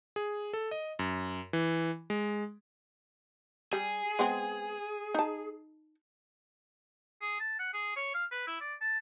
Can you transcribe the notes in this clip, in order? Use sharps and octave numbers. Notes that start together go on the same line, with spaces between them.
G#4
A4
D#5
F#2
E3
G#3
G3 G#4
G#3 B3 C4
D#4 A5
G#4
A5
F#5
G#4
C#5
F5
B4
E4
D5
A5